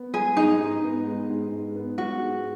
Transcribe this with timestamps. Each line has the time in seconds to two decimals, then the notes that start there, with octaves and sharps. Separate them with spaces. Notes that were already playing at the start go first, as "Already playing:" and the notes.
Already playing: B3
0.14 G#3 G#4
0.37 G#2 D#4
0.60 G#2
0.84 B3
1.07 G#3
1.29 G#2
1.53 G#2
1.75 B3
1.98 G#3 F#4
2.21 G#2